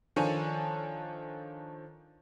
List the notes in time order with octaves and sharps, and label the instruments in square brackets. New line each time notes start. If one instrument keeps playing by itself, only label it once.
[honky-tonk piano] D#3 F3 D4 A4 C#5 G#5